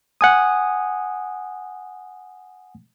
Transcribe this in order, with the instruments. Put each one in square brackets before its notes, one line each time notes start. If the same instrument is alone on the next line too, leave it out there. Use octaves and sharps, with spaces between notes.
[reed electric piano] F#5 G#5 D#6